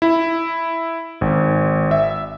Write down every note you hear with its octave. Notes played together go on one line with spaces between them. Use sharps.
E4
G#1
E5